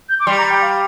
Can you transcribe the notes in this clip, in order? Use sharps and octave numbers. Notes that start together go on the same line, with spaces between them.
G6
D6
G3 C6
A#5
G5
F5